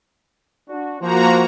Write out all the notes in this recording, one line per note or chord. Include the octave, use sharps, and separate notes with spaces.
D4 F#4
F3 A#3 F#4 C5 A#5